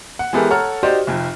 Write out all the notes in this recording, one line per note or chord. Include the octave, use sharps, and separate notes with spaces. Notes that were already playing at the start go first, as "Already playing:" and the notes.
F#5
E3 G#3 B3 G4 A4 A#4
A4 C#5 F#5 A#5 F6
D#4 F#4 G4 C5 D5
F1 F2